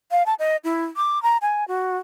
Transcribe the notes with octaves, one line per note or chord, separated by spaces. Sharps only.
F5
A5
D#5
E4
D6
A#5
G#5
F#4